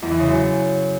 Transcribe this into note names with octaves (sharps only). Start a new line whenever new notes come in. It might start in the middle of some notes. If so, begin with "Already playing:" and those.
E2
E3
C#3
F#2